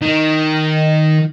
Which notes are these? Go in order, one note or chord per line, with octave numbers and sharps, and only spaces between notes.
D#3